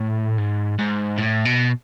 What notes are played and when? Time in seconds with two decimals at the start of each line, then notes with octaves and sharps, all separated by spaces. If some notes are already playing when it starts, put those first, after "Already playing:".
Already playing: A2
0.38 G#2
0.79 G#2
1.18 A2
1.45 B2